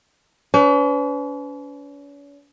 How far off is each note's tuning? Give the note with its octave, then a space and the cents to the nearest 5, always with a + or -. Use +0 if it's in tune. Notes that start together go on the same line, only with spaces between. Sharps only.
C#4 +45 B4 +35